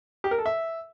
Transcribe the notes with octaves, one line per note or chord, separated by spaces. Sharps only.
G4
A#4
A4
E5